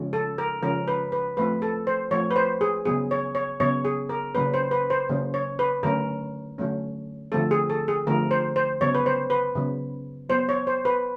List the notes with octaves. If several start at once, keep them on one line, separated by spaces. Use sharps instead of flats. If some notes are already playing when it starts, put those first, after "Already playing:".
Already playing: C#3 F3 G#3 C#4
A4
A#4
C#3 F3 G#3 C#4 A#4
B4
B4
F3 A3 C4 B4
A4
C5
F3 A3 C4 C#5
B4
C5
G#4
C#3 F#3 B3 G#4
C#5
C#5
C#3 F#3 B3 C#5
G#4
A#4
C#3 F#3 A#3 C#4 B4
C5
B4
C5
C#3 F#3 A#3 C#4
C#5
B4
D3 F#3 A3 C#4 A#4
D3 F#3 A3 C#4
D3 F3 A3 C4 A4
G#4
A4
G#4
D3 F3 A3 C4 A#4
C5
C5
C#3 F#3 B3 C#5
B4
C5
B4
C#3 F#3 B3
F#3 B3 C5
C#5
C5
B4